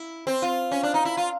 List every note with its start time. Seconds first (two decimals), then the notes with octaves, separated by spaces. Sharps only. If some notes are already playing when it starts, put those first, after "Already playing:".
Already playing: E4
0.27 C4
0.42 F4
0.71 C#4
0.83 D4
0.94 D#4
1.05 E4
1.17 F4